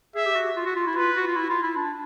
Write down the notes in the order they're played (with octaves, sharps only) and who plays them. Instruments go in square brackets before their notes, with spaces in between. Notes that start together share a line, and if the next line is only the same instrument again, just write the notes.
[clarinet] G#4 [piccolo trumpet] E5
[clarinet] G4
F#4
F4
F#4
F4
E4
[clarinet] F4 [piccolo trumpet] B4
[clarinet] F#4
F4
E4
F4
E4
D4